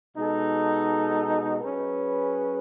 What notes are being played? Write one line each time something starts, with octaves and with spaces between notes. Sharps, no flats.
B2 G#3 D#4 A4
F#3 C#4 G#4 B4